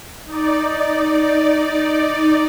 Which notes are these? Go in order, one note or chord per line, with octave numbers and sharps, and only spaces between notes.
D#4 D5